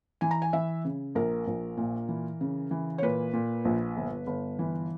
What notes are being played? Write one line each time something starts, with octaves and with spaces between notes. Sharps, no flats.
E3 G#5
A#5
G#5
E3 E5
C#3
A#1 A#4
A#1
A#2
E3
C#3
E3
C#5
A#2 B4
A#2
A#1
G1
G1
E3